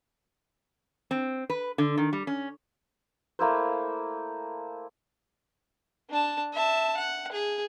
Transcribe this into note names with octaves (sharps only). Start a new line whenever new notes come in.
C4
B4
D3
D#3
G3
C#4
A3 A#3 E4 C5
D4 A5
E5 A5
F#5
G#4